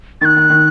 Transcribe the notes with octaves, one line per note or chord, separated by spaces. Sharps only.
D#3 F#6 A6
D#3
D#3